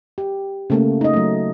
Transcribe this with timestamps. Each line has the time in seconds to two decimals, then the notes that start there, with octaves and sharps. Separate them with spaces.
0.18 G4
0.70 C#3 A3 A#3
1.01 D#4 D#5
1.13 F#3 A3